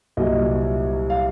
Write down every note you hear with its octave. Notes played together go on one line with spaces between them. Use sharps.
C2 A#2 F#3 D#5
F5